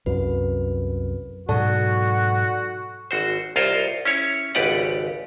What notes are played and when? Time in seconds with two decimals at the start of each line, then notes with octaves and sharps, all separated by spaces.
0.06 C2 F#2 B4
1.49 G#2 B2 F#3 F#4 A4 D5 A5
3.11 G#1 F#4 C5
3.56 C2 F4 A#4 C5 C#5 D#5
4.05 C#4 E4 C#5
4.55 G#1 C#2 G4 B4 D5 F#5